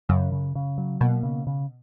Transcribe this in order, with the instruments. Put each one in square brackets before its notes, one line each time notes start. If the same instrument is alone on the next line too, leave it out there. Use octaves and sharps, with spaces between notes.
[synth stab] F#2 [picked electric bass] C#3
[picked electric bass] C#3
C#3
F#3
[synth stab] B2 [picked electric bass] A#3
[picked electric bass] C#3
C#3